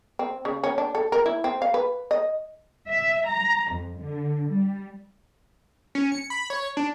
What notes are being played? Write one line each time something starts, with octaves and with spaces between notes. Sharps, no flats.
C4
C#3
C#4
D4
A4
A#4
E4
C4
F5
B4
D#5
E5
A#5
F2
D3
G3
C#4
C#7
B5
C#5
D4